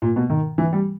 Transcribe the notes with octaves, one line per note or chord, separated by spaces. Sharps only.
A#2
B2
D#3
E3
G3